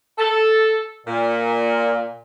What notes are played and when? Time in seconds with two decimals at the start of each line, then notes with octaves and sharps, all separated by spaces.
0.18 A4
1.07 A#2